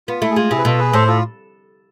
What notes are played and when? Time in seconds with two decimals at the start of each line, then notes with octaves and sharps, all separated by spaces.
0.08 B3 F4
0.22 A3 E4
0.31 G#4
0.36 G#3 F4
0.50 C3 E4 G#4
0.58 B4
0.65 B2 F4 A4
0.79 G#4 B4
0.93 A2 A4 C5
1.08 F4 A4